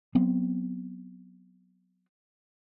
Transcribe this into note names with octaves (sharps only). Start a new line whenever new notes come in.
F#3 B3 C4